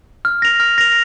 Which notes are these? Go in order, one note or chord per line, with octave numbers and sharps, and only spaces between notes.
F6
A#6 F7
F6
A#6 F7